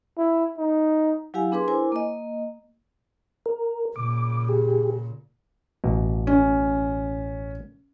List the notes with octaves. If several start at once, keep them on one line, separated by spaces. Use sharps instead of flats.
E4
D#4
F#3 E4 G4 F5 G#5
B3 D4 G#4 B4 C6 D6
E4 A#4 C5 G#5 D6
A#3 D#5
A#4
A#2 C#3 D6
G4 G#4
A1 B2
C#4